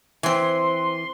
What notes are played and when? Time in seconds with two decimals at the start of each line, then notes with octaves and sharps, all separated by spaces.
0.23 E3 C4 G#5 C6